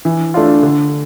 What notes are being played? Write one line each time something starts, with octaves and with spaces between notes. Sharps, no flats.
E3
A3 D4 F4
D3